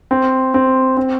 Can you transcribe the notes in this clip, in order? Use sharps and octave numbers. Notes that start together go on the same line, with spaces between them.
C4
C4
C4